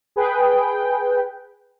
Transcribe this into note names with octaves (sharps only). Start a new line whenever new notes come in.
G#4 B4 G5